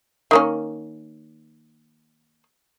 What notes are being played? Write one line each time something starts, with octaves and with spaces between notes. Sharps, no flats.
D#3 A#3 C#4